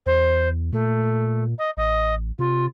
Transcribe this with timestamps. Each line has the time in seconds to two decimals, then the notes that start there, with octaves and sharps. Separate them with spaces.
0.06 E2 C5
0.73 A#2 A3
1.58 D#5
1.77 A1 D#5
2.39 C3 F4